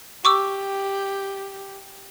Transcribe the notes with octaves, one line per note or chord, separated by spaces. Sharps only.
G4 C#6 D6 E6